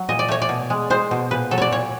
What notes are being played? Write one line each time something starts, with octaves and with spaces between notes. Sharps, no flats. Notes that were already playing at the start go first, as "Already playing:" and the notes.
Already playing: F#3
A#2 D#5
D5
A3 C#5
D5
B2
G#3
G#3 C5
B2
A#2 B4
F#3 A4
C#5 D5
A#2 C#5